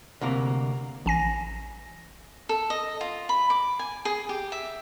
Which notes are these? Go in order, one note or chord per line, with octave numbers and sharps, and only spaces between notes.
D2 C3 A#3
A1 G#5 A#6
A4
D#5
F4
B5
D6
G#5
G#4
G4
E5